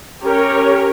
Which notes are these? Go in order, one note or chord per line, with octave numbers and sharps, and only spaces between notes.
C#4 G4 A#4 C#5